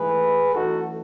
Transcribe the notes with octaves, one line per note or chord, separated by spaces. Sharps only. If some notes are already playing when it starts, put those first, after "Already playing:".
Already playing: G#2 E3 A3 G#4 B4
F#2 E3 A3 D#4 F#4 A4